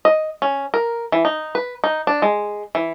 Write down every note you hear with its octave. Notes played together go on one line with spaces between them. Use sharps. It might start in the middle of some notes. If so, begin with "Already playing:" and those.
D#5
C#4
A#4
E3
D#4
B4
D#4
D4
G#3
E3